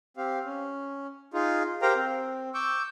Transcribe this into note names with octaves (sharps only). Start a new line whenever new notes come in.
C4 G4 F5
C#4
D#4 F4 G#4
G4 A#4 C5 F5 G5 A#5
C4
C#6 D6 E6 G6